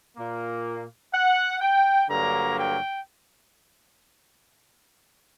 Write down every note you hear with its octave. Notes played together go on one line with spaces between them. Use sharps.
A#2 A#3
F#5
G5
G2 D3 F#3 A#3 A#5
G5